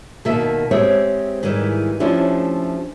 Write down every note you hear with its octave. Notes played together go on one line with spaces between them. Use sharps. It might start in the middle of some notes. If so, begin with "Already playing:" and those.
B2 D#3 A#3 D#4 E5 A5
G#3 C4 G4 C5 C#5 E5
G#2 D#3 E3 G3 G#3
F3 A3 C#4 D4 E4 G4